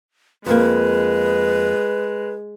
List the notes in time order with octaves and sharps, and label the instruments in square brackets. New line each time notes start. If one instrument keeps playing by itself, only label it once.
[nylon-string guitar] F2 A#3 [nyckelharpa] G#3 [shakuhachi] B4